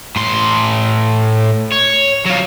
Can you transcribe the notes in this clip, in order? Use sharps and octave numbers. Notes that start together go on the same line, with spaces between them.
A2 C6
C#5
F#3 F4